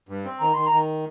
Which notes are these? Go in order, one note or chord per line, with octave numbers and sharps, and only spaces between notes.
G2
C4
D#3 A#5
D#3 C6
A#5
D#3